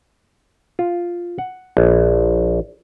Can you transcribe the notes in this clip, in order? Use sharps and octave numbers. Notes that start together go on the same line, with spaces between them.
F4
F#5
A#1